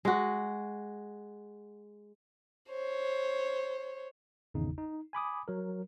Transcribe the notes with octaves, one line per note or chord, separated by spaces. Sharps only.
G#3 F#4
C5 C#5
G#1 E2 C#3 D#4
D#4
G#5 B5 D6 D#6
F#3 A#4